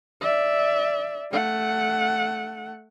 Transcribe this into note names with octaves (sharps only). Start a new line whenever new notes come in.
D5 E5
A3 F#5